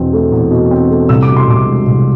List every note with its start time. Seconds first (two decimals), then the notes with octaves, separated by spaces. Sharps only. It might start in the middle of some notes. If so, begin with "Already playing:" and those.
Already playing: E2 B2 C4
0.13 A3
0.32 E2
0.51 B2
0.71 C4
0.90 A3
1.09 C2 E6
1.23 D6
1.28 B2
1.37 C6
1.47 C2 D6
1.66 G#3
1.86 C2